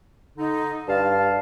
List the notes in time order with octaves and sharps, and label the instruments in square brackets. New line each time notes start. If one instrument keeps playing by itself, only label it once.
[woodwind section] D3 D#4
[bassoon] G2 [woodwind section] F5 A5